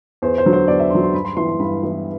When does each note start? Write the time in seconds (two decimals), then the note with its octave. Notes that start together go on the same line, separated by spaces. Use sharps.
0.22 E2 C5
0.38 C5
0.45 D3 F#3
0.53 C5
0.68 E2 D5
0.80 E5
0.90 D3 F#3 C6
1.03 C6
1.13 G2 B5
1.25 C6
1.36 E3 B3 E4 C6
1.49 C6
1.59 G2 B5
1.83 E3 B3 E4